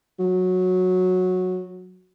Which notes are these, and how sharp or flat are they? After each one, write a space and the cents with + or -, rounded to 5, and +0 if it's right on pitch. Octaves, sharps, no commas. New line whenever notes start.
F#3 -10